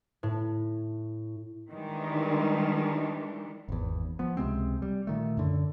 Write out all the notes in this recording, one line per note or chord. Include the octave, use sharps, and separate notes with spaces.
A2
D#3 E3 G3 G#3 D4
G#1 E2
F3 B3
C#2 C3 G#3 C4
G3
A#2 D#3 A3
F#2 D3